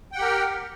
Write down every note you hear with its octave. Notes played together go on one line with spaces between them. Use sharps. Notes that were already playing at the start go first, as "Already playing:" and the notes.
G4 A#4 F#5 G5